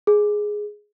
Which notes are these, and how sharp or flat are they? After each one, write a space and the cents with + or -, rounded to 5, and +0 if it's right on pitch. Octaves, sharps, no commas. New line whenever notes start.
G#4 +5